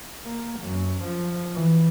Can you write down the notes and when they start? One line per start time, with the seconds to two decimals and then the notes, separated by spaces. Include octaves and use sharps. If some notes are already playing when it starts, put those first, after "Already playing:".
0.24 A#3
0.60 F#2
1.03 F3
1.54 E3